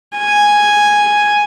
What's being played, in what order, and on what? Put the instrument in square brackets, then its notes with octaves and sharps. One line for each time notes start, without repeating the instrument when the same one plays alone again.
[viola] G#5